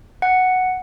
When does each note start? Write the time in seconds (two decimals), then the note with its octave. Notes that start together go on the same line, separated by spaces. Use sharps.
0.22 F#5